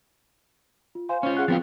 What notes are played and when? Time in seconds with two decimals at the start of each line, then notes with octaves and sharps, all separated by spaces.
0.95 F4
1.09 C5 F5 G#5 C6
1.23 C#4 F4 C5
1.37 G#4 F#5 F#6
1.48 F3 B3 C4 F4 A6